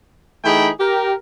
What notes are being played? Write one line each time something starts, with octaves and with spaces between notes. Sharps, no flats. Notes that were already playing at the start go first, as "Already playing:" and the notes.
E3 A3 D#4 G#4 G5 B5
G4 A#4